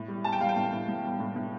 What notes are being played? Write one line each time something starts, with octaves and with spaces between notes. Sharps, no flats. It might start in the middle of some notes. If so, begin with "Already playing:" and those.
Already playing: A2
G3
G3 A5
G5
G3 F5
G5
A2
A2
A2
G3
A2
A2